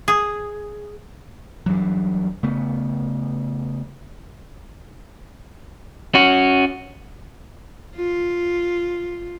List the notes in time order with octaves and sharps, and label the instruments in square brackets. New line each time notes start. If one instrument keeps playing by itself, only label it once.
[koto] G#4
[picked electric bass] G2 E3 F#3
C#3 A3 B3
[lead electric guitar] C#4 F#4
[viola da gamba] F4